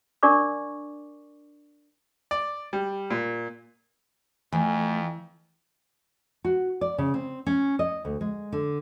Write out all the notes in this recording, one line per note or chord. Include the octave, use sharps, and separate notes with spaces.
D4 A#4 D5 C#6 D6
D5
G3
A#2
F2 E3 A3 G#5
F#4
D5
C#3
C4
C#4
D#5
D2
G#3
D3